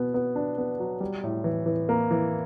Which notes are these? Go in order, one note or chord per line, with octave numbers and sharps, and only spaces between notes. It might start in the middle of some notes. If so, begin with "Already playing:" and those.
Already playing: B2 B3
B3
D4
B3
F#3
G3
A2
E3
E3
A#3
E3